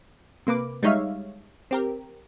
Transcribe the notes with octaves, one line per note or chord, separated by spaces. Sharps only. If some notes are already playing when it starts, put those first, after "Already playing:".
C3 A#3 B4 D6
G3 G#3 D#4 C#5 E5 F5
C4 G4 A#4